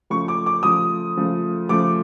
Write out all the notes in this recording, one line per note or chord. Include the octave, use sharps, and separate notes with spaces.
C#3 F3 A3 C#6
D6
D6
C#3 F3 A3 D#6
C#3 F3 A3
C#3 F3 A3 D6